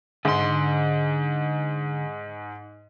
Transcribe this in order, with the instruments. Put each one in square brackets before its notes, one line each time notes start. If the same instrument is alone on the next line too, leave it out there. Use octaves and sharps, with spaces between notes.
[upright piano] G#2 [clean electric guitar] D3 C6